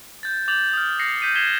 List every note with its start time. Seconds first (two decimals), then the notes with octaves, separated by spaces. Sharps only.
0.23 G6 A6
0.48 D6 G6 A6 F7 F#7
0.73 D#6 F6
0.99 A#6 C7 C#7
1.22 G6 B6 D#7
1.35 G#6 B6 C7 E7 G7